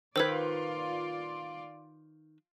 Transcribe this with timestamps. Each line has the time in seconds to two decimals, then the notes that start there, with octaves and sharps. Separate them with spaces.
0.16 D#3 F4 B4 C5 D5 E6 G#6